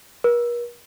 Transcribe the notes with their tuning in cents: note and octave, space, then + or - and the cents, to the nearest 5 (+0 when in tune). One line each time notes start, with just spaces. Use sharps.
A#4 +45